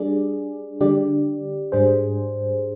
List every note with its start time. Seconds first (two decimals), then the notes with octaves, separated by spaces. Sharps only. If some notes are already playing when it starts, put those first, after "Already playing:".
Already playing: G3 D4 G#4 D5
0.81 D3 G3 D4 G4 D5
1.72 G#2 G3 D4 G#4 C5